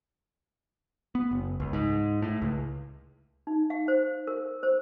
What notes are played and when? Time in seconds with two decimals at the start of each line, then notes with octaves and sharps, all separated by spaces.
1.15 B3
1.31 F#1
1.60 C#2
1.73 G#2
2.22 A2
2.42 C#2
3.47 D#4
3.70 F5
3.88 C5
4.27 A#4
4.63 C5